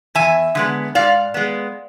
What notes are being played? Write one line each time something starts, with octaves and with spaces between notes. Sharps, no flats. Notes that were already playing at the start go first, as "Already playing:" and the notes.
E2 E5 G#5
D3 G#3 B3
G#2 D5 F5
G#3 B3